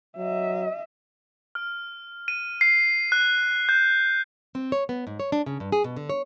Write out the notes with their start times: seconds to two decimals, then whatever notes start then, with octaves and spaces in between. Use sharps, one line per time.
0.18 F#3 D#5 E5
1.55 F6
2.28 D#7
2.61 C7
3.12 F#6
3.69 G6
4.55 C4
4.72 C#5
4.89 B3
5.07 G#2
5.20 C#5
5.32 D4
5.46 C#3
5.60 G2
5.72 G#4
5.84 B2
5.97 D3
6.10 C#5